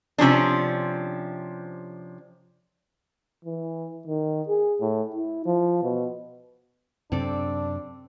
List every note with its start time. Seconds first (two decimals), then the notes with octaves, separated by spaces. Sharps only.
0.18 C3 F3 C#4 D4
3.45 E3
4.07 D#3
4.48 G#4
4.81 A2
5.15 E4
5.46 F3
5.83 B2
7.12 F#2 C3 C4 D4 A4 D5